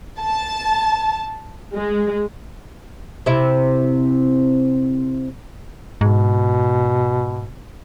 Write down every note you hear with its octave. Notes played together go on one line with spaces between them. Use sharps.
A5
G#3
C3 E4
G#2 B2